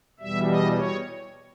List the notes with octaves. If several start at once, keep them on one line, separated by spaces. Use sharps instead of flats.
E2 B2 G3 E5
D#5
C#5